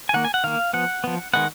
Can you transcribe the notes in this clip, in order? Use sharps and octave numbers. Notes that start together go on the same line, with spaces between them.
G#5
D#3 A#3 F#5
G#5
F#5
D#3 A#3 F5
F3 B3 F#5
F3 B3
D#3 G#3 B3 F#5